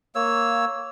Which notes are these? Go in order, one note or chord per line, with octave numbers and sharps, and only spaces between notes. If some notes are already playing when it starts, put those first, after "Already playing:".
A#3 C#5 E6